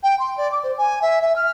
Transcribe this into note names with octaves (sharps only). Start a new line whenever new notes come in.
G5
C6
D5
D6
C5
G#5
E5
E5
F6